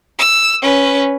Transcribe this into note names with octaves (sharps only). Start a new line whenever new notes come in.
E6
C#4 B4